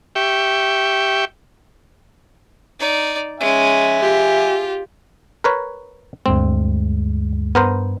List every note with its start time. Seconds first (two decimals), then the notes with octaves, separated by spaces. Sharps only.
0.15 G4 E5 G5 C#6
2.80 D#4 D5
3.40 G#3 C#4 E5 G#5
4.02 F4 G4
5.44 A#4 B4 C#5
6.26 D2 G2 G#3 C4
7.55 G2 B3 A#4 C5